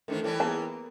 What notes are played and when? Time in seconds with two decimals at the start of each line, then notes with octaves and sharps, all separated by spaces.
0.08 D#3 E3 A3 C4 D4
0.24 E3 G3 C#4 A4
0.40 A#3 B3 G#4 A5